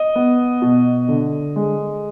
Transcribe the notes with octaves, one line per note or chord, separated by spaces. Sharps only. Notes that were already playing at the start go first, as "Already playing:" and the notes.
Already playing: D#5
B3
B2
D3
G#3